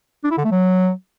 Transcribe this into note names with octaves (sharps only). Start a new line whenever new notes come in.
D4
E4
D3
A3
F#3